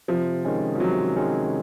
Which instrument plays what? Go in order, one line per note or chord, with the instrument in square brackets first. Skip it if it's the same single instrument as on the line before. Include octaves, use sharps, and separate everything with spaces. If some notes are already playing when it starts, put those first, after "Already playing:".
[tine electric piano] C3 [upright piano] F3
[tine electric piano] D#3 G#3 C#4
[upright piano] F3
[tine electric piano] C3 [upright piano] F#3
[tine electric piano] D#3 G#3 C#4